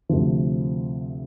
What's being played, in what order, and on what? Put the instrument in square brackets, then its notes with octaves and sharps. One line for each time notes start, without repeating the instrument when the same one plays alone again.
[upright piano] D2 C3 F3